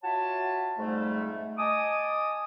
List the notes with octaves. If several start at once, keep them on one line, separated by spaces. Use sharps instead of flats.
F4 F#4 C#5 E5 A5
F2 G#2 G3 A3
D#5 G#5 A5 D6 D#6